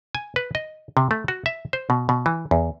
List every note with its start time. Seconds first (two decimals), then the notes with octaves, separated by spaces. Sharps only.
0.15 G#5
0.36 B4
0.55 D#5
0.97 C3
1.11 A3
1.28 F#4
1.46 E5
1.73 C5
1.90 B2
2.09 B2
2.26 E3
2.51 E2